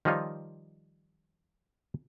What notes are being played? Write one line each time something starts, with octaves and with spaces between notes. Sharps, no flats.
D#3 F3 G3 D#4 F4 C#5